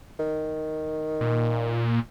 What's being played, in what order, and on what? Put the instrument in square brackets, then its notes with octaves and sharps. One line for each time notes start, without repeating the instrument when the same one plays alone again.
[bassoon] D#3
[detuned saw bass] A#2